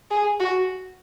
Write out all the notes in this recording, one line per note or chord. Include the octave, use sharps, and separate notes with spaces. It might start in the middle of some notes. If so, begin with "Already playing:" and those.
G#4
F#4